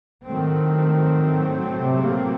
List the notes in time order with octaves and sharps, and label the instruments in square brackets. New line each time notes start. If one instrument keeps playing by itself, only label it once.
[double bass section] A2 F#3 A3 C4 [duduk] D#3
[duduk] C3
A#3